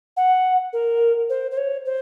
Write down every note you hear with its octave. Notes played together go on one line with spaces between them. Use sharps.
F#5
A#4
C5
C5
C#5
C5